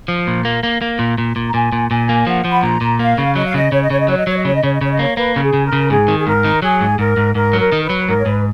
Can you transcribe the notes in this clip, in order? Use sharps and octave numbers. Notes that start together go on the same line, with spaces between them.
F3
A#2
A#3
A#3
A#3
A#2
A#2
A#2
A#5
A#2 G#5
A#2
A#2 G#5
A#3
F3 F#5
F3
B5
A#2 A#5
A#2
A#3 F5
C#3
F#3 D#5
F5
C#3 D#5
C#3 C#5
D#5
C#3 C#5
D#5
F#3 C#5
D#5
F#3 C#5
D#5
C#3 C#5
D#5
C#3 C#5
D#5
C#3 C#5
D#5
A#3 C#5
A#3 B4
C#3 A#4
G#4
C#3
A#4
C#3
G#2 G#4
D#3
G#4
G#2 A#4
D#3
F#3 G#4
G#2
G#2 A#4
G#2
G#2 A#4
F#3
A#4
D#3
B4
F#3
G#2 A#4
C#5
G#2 B4